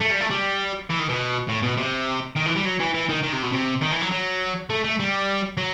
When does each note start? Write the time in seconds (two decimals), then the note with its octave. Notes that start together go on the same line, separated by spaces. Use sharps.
0.01 A3
0.11 G3
0.21 A3
0.31 G3
0.90 E3
0.99 D#3
1.09 B2
1.48 A2
1.62 B2
1.77 C3
2.36 D#3
2.46 E3
2.55 G3
2.65 F#3
2.80 E3
2.94 E3
3.09 D#3
3.23 D#3
3.33 C3
3.43 B2
3.53 C3
3.82 D#3
3.92 E3
4.02 F#3
4.12 F#3
4.70 A3
4.84 A3
4.99 G3
5.57 F#3